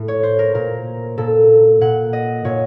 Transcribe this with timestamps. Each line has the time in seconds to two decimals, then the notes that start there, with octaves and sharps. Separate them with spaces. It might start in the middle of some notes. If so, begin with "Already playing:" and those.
Already playing: A2
0.08 C#5
0.23 C5
0.39 A#4
0.55 A#2 A#4
1.18 A#2 A4
1.81 A#2 F#5
2.13 D#5
2.45 A#2 C#5